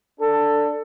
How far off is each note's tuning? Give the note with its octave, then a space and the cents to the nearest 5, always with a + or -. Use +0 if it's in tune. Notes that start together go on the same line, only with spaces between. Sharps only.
D4 +0 A4 +15